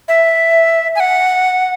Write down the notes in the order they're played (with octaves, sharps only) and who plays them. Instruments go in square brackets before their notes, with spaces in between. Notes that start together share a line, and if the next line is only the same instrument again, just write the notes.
[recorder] E5
G#5
F#5